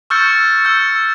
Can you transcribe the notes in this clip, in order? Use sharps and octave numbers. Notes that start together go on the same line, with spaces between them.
C#6 E6 F6 G6 A6 C#7
E6 G6